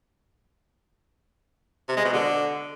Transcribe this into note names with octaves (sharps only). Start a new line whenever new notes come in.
C3
G#3
B2
D3